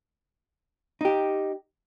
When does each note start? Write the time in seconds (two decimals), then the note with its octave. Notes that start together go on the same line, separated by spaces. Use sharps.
1.01 D#4 G4